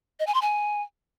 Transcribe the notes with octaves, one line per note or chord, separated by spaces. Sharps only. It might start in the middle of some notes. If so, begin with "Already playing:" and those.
D#5
G#5
C6
G#5